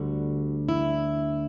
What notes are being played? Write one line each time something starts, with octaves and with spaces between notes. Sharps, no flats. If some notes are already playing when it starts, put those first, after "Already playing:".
Already playing: D2 D3 G3 F#4
E4